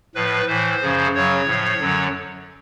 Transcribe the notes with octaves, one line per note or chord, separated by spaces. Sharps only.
A2 F3 B4
A2 E3 C5
F#2 C#3 F3
F#2 C#3 F#3 C#5
A2 F3
F#2 D3 F#3